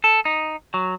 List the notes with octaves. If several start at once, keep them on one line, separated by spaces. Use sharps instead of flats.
A4
D#4
F#3